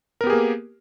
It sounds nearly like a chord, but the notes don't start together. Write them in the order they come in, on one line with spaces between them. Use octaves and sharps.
A#4 B3 G4 G#4 A#3